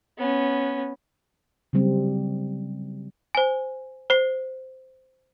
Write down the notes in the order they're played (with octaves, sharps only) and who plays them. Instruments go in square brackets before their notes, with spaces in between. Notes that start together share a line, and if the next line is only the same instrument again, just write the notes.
[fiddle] B3 C#4
[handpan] C#3 F#3 G3 C4
[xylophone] C5 G#5
C5 C7 G7